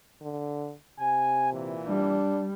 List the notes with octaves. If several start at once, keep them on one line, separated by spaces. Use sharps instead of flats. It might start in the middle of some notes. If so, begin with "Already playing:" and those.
D3
C3 G#5
A#2 E3
G3 D4